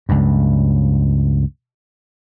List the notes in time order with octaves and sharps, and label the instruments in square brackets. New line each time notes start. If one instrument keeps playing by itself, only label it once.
[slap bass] C#2 G2